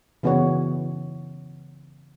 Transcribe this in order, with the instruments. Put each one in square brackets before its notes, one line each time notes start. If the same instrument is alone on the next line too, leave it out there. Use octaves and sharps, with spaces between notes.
[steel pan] C#3 E3 B3 F#4 C#5